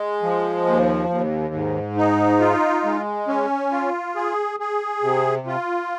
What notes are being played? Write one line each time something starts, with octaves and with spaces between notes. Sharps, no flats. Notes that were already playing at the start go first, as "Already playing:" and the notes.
Already playing: G#3
F3
D#2
D#2
G#2
D#4
F4
G#3
C#4
F4
G#4
G#4
C3
F4